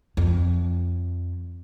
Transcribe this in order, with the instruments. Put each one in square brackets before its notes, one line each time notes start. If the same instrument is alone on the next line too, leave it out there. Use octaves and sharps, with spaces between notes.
[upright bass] F2